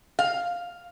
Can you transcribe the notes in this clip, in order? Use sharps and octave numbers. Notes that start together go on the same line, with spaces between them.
F5